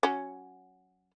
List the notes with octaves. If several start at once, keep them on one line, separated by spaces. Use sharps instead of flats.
F#3 C#4